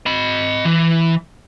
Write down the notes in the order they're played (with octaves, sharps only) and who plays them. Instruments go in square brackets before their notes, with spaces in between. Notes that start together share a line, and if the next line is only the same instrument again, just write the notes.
[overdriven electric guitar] D#5 B5
E3